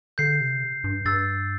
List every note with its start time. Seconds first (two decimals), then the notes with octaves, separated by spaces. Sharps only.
0.18 D3 G6 C7
0.41 C3
0.84 G2
1.06 G2 E6 A6